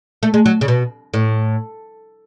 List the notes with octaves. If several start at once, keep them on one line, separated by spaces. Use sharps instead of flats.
A3
G#3
F#3
C#3
B2
A2